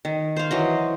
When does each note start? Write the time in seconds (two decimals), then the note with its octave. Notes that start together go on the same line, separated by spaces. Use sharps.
0.05 D#3
0.36 C5 F5
0.51 E3 F#3 D#5